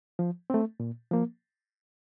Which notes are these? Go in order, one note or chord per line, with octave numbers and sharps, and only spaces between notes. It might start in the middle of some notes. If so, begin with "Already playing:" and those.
F3
A3 C4
A#2
F3 A#3